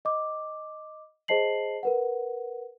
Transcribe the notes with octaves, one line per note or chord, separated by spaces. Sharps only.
D#5 D6
G#4 C5 D#5 A5 C7 F#7
A#4 B4 F#5